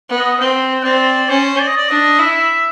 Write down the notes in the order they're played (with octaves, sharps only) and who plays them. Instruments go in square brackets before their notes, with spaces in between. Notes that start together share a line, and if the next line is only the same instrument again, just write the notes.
[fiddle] B3
[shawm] D#5
[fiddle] C4 [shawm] G5
[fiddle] C4 [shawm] D5
[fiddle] C#4 [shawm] C5
[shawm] D5
D#5
D5
[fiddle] D4 [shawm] D#5
[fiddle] E4 [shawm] E5